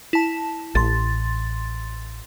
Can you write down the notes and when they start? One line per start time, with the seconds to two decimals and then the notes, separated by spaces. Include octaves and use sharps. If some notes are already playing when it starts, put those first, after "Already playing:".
0.13 E4 A5
0.75 A1 C6 A6